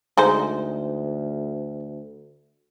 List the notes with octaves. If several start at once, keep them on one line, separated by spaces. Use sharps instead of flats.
D2 G#3 D#4 C5